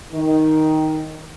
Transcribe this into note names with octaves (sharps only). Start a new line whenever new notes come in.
D#3